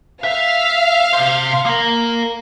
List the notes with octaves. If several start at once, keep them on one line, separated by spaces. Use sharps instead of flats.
E5 F5
C3 C5
A#3 A#4